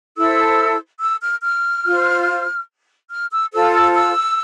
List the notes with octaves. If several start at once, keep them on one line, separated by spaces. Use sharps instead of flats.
E4 A4 C5 E6
E6
F6
F6
F4 C5
F6
E6
F4 A4 C5 E6
E6
E6